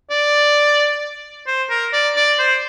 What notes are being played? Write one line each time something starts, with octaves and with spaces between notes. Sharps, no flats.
D5
C5
A#4
D5
D5
C5